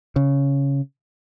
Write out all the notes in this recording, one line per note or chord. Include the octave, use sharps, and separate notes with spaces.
C#3